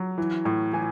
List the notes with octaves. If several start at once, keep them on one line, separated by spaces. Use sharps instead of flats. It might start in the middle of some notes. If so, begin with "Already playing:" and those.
Already playing: F#3
E3
A2
E3 G#5